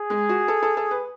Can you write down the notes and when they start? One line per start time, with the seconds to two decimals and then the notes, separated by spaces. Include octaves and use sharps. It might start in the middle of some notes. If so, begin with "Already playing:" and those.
Already playing: G#4
0.10 G#3
0.29 F#4
0.48 A4
0.62 A4
0.77 A4
0.91 B4